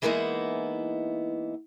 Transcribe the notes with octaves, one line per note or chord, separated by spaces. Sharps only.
E3 G#3 A#3 B3 D#4 E4